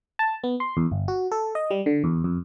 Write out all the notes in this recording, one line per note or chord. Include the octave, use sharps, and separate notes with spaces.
A5
B3
C6
E2
G1
F#4
A4
D#5
G3
D3
E2
F2